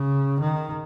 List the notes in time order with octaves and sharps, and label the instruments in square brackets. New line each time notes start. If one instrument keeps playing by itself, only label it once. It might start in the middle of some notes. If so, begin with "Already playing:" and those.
Already playing: [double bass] C#3
D#3